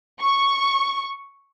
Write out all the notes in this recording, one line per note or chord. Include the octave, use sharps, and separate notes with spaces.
C#6